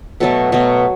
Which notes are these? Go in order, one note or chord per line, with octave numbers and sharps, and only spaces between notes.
B2 F#3 A3 A4
B2 F#3 A3